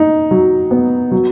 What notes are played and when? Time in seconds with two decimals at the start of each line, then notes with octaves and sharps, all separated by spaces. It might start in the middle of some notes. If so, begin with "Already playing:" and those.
Already playing: D#4
0.31 F#3
0.71 B3
1.11 F#3